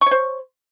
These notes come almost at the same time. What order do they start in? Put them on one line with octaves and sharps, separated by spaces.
C#6 C#5 C5